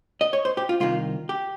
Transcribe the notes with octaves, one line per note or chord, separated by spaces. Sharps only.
D#5
C#5
C5
G4
F4
C2 C3 D#3 F4
G4